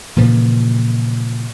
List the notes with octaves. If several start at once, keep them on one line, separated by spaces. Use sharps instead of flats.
A#2 C#3 E3 F3